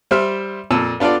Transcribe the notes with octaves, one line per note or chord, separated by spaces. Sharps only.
G3 C5 E5 F6
F2 A#2 A5 E6
B3 D4 F4 A4 D5